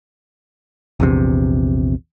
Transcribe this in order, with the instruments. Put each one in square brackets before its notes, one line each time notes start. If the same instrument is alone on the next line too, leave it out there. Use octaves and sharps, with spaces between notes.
[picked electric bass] A#1 E2 C3